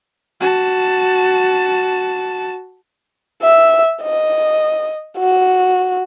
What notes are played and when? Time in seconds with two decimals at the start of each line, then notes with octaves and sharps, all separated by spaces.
0.40 F#4 A5
3.43 E5
4.03 D#5
5.18 F#4